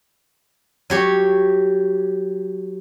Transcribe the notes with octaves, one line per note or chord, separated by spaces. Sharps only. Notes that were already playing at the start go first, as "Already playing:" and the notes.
F#3 G4 C#5